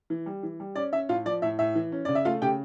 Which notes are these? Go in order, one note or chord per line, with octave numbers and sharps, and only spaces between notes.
E3
G3
E3
G3
C#4 D5
C#4 E5
A2 F4 F5
F3 D5
A2 E5
A2 E5
E3
C#4
C#3 D5
E5
A3 F4 F5
C#3 G4 G5